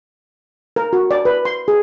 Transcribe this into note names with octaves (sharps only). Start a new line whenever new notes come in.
A#4
F#4
D5
B4
C6
G#4